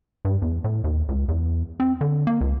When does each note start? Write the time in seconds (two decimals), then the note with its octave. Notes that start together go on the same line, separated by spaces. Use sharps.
0.25 G2
0.42 E2
0.64 A2
0.84 D#2
1.09 C#2
1.28 E2
1.80 C4
2.01 D3
2.27 A#3
2.41 C#2